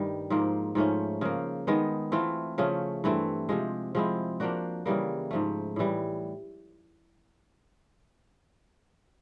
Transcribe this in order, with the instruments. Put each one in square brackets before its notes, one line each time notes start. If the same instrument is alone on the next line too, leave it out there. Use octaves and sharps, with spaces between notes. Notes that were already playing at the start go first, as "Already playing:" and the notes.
Already playing: [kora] G2 D#3 G3 A3
G#2 F3 A#3
G#2 F3 A3 C#4
C#3 F3 A#3
D#3 G#3 B3
E3 A3 C4 F4
C#3 F3 A3 C#4
G2 E3 A3 C4
C3 F3 G#3
F3 G#3 C4 E4
F3 A#3 D4 F#4
C#3 E3 G3 A#3
G#2 F3 A3
A2 E3 G3